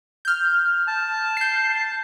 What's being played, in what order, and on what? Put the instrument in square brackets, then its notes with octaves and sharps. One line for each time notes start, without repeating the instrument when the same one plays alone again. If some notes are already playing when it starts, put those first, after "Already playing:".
[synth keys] F6 G6
[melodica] A5
[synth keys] G6 C7